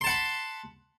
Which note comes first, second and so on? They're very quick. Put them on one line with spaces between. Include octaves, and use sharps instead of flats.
C6 A5 F#5 B5